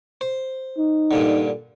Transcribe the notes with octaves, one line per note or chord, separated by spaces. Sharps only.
C5
D#4
G2 A#2 D3